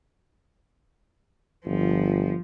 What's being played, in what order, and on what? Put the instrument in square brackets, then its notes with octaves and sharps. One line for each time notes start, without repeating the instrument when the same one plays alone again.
[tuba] G1 [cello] F3